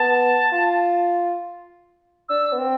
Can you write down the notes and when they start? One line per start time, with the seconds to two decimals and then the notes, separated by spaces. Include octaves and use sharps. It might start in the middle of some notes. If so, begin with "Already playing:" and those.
Already playing: B3 A5
0.52 F4
2.29 D4 E6
2.53 B3
2.58 C4